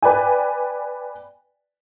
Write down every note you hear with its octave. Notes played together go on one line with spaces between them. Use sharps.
B4 D5 G5 G#5